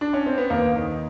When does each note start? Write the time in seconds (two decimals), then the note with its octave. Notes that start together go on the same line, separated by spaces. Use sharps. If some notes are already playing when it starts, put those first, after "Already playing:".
0.01 D4
0.13 C#4
0.26 C4
0.38 B3
0.50 D#2 A#3
0.76 D#3